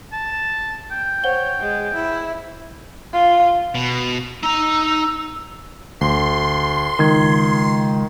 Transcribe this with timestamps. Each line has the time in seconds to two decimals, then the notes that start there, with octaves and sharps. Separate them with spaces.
0.12 A5
0.91 G5
1.24 C5 C#5 F#5 G7
1.60 G#3
1.95 E4
3.13 F4
3.75 B2
4.43 D#4 A#5 E6
6.01 D2 C6
6.99 C#2 D#3 G#6